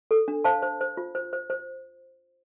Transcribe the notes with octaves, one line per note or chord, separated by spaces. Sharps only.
A4
D4
C5 F5 A5
C5
C5
F4
C5
C5
C5